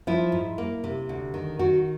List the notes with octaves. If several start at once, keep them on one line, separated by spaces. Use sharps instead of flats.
F3 E4
G#2
A#3
C3
D2
D#3
D#3 F#4